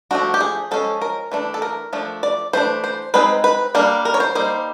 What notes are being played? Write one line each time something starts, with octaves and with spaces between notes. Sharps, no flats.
F3 A3 D4 F#4
G4
G#4
F3 G#3 C#4 A4
A#4
E3 A3 D4
A4
A#4
F3 A3 D4
D5
E3 A3 D4 C5
C5
G#3 C4 D#4 B4
B4
G3 A#3 D4 A#4
A#4
C#5
C5
G3 A#3 D#4 C5